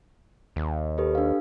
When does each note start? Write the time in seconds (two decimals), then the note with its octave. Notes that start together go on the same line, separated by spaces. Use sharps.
0.56 D#2
0.98 G4 A4 B4
1.15 D4 F5